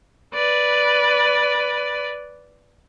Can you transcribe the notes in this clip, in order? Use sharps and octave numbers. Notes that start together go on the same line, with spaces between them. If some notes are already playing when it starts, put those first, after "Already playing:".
B4 D5